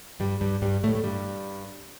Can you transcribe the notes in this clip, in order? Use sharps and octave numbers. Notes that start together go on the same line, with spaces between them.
G2 G3
G2 G3
G2 G3
A2 A3
A3
G2 G3